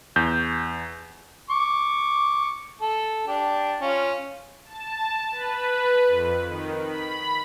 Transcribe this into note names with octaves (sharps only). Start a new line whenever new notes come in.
E2 G6
C#6 D6
A4
D4 G4
C#4 F4
A5
B4
F2
D#3
B5